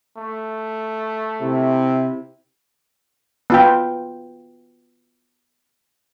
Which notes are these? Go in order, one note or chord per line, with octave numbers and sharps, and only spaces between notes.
A3
C3 E4
B3 F4 G5